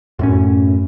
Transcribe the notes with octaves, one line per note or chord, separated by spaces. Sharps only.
F#2 A2 C#4